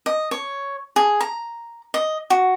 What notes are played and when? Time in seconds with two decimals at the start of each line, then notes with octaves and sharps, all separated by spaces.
0.06 D#5
0.31 C#5
0.96 G#4
1.21 A#5
1.94 D#5
2.30 F#4